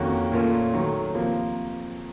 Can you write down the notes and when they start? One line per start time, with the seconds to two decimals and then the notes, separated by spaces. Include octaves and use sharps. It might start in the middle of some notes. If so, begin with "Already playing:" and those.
Already playing: F2 D#3 A#3 C#4 F#4
0.32 A#2 A3 C#4 F4 A#4
0.74 D#3 F#3 A3
1.15 C3 F3 A#3